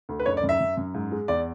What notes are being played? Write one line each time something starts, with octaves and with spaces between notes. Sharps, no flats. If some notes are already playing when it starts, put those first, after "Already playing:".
D2
B4
F#1 C#5
D5
F#2
E5
F#2
F#2
G#2
G#3
E2 D5